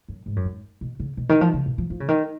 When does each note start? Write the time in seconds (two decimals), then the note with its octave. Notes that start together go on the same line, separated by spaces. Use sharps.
0.08 F#2
0.26 G#2
0.36 F#2
0.45 G#2
0.81 B2
1.00 C#3
1.17 B2
1.29 D#3
1.41 F3
1.54 C#3
1.66 B2
1.78 F3
1.90 F3
2.00 C#3
2.08 D#3